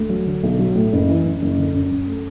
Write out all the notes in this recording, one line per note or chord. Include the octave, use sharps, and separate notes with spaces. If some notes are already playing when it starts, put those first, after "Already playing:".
Already playing: D2
F#3
D3
B1
F#3
A2
F#1
E3
F#2
F#1
D3
F#2
F#2
A3